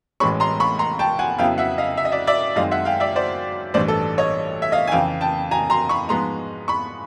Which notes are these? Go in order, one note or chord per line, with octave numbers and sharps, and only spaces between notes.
A1 A2 E3 G#3 C#4 B5 C#6
A#5 C6
B5 C#6
A#5 C6
G5 A5
F#5 G#5
F2 C#3 F#3 B3 E4 F5 G5
E5 F#5
D#5 F5
E5
D#5
D5 E5
D5 E5
F#2 D#3 G#3 C4 D#5 F5
E5 F#5
F5 G5
D5 E5
C5 D5
A1 G2 E3 C5 D5
A4
C#5 D#5
E5
D#5 F5
G#5
F2 C#3 E3 F5 G5
G5 A5
G#5 A#5
A#5 C6
B5 C#6
G#2 F3 G#3 B3 A#5 C6
B5 C#6